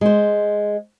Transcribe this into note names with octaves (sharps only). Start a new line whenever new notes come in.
G#3 C5